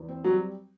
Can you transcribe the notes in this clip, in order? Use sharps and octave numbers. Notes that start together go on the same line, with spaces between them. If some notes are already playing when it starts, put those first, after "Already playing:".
Already playing: E2
C4
F#3 G3